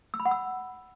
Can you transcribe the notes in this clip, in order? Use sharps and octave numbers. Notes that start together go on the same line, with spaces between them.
E6
B5
F#5
E6